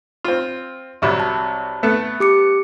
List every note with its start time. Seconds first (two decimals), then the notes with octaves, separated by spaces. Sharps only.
0.24 C4 F4
1.02 C2 C3 F#3
1.20 A5
1.83 A3 B3 A4
2.20 G4 D6 C#7